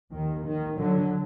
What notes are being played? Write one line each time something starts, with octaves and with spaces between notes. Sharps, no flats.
D#2 D#3
D#3
D3 F#3